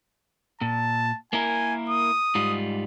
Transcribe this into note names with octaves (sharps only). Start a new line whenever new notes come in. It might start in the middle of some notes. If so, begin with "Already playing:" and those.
A#2 A5
A#3 E4 A#4 G#5
D#6
G#2 G3 F4